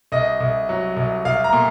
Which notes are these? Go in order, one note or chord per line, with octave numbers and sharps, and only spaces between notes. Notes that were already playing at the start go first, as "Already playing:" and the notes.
C2 D#5
C2
F#3
C2
C2 F5
A#5
A#2